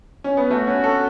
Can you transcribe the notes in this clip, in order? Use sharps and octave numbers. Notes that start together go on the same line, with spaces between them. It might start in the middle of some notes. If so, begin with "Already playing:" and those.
C#4
B3
A3 F#4
C#4
A4